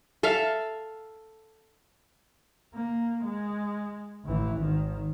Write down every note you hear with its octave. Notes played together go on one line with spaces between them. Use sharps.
A4 E5 F5
A#3
G#3
A1 E3
G#1 D#3